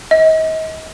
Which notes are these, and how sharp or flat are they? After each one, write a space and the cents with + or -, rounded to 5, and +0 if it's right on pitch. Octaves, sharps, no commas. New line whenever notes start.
D#5 +35